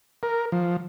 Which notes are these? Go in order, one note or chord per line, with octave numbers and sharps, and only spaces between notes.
A#4
F3